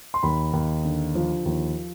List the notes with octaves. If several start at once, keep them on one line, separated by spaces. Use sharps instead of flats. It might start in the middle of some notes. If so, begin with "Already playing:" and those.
C6
D#2 B5
D#2
D3
F3
D#2